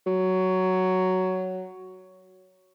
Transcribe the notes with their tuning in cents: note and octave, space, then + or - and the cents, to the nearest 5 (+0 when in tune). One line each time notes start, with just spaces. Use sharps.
F#3 +10